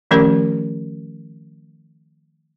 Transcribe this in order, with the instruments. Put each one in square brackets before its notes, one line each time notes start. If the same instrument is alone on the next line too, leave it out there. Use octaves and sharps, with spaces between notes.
[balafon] D#3 F3 A3 C#4 G4 A#4